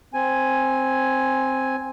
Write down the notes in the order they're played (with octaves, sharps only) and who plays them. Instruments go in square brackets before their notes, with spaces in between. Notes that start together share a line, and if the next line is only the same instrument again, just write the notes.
[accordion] C4 G#5